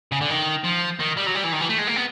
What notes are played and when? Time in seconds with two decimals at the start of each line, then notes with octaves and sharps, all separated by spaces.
0.12 C#3
0.21 D3
0.30 D#3
0.64 F3
0.99 D#3
1.17 G3
1.26 F#3
1.35 G3
1.44 E3
1.53 D#3
1.61 E3
1.69 A3
1.79 G#3
1.87 A#3
1.96 B3